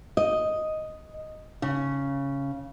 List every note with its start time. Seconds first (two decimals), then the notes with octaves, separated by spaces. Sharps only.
0.17 D#5
1.62 C#3